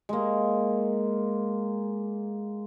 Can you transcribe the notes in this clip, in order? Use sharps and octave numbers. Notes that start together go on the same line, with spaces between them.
G#3 A#3